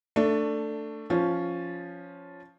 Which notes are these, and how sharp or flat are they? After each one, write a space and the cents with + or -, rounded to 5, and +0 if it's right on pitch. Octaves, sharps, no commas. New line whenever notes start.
A3 +15 D4 +0
F3 +0 C#4 +5